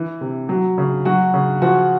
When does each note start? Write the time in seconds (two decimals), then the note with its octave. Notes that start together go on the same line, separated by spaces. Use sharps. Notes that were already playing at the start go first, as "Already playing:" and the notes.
Already playing: E3
0.21 C3
0.49 F#3
0.78 C#3
1.05 F#3 F#4
1.34 C#3
1.62 F3 F#4